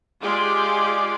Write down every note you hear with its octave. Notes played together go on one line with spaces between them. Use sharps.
G#3 F4 G4 G#4 D5